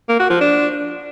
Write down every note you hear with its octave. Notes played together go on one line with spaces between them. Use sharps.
A#3
F#4
F3
D4